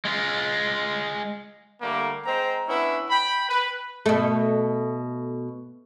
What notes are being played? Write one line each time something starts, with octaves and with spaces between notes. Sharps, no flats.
G#3 F4
D3 G3 A3 A#3
G#3 C4 C5 A#5
B3 C#4 D4 E4
G5 B5
B4
B2 A3